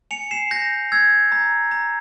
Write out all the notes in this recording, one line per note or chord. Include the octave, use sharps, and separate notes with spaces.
G#5 C#7 F7
C7 E7
G6 A#6
E6 G#6
A#5
A#5